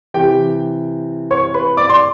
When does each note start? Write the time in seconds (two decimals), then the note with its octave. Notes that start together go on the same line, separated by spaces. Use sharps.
0.14 C3 E3 G4 G5
1.31 C#5 C#6
1.54 B4 B5
1.77 D5 D6
1.89 C6